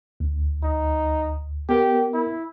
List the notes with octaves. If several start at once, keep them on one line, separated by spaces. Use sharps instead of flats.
D2
D#4
B3 G4 A#4
E4